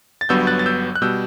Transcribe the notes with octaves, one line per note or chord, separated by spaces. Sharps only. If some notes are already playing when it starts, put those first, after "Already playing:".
A6
G1 G2 F#3 B3 E6 G6
F#6 A6
A6
E6 G6
F#6
B2 G3 E6 G6